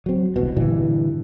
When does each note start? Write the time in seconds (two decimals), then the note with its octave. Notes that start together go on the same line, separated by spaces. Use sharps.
0.06 F#3 C4
0.36 E1 C2 B2
0.57 G2 A#2 D3 E3